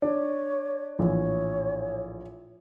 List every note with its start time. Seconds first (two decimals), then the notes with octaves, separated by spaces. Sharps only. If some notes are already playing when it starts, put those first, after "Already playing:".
0.02 D4 C#5
0.99 A#1 A2 E3 C#5